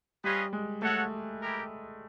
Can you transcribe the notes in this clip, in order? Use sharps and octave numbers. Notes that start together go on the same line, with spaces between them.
G3 C#4 F4 G#4 B4 D#5
G#3
A3 F#4 A4 C#5 F#5
E4 G4 A#4